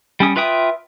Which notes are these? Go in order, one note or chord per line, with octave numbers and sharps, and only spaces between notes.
G3 C#4 D#6
F4 B4 E5 G5 D#6